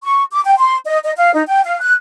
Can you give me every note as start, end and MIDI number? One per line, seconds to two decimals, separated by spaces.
0.03 0.23 85
0.32 0.40 86
0.45 0.53 79
0.57 0.77 84
0.86 0.98 75
1.03 1.11 75
1.16 1.33 77
1.33 1.42 63
1.47 1.61 79
1.64 1.77 77
1.80 1.92 90